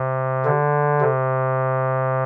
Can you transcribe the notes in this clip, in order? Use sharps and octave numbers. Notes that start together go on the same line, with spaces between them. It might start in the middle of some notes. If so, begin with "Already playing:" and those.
Already playing: C3
D3
C3